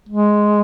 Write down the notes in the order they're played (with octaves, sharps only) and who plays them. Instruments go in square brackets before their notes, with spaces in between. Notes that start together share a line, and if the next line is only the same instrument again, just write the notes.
[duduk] G#3